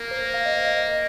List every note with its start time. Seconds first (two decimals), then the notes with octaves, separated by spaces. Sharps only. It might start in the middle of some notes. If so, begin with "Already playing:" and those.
Already playing: A#3 A#4
0.11 C5
0.34 F5
0.46 D#5
0.55 C5
0.66 D#5
0.83 D#5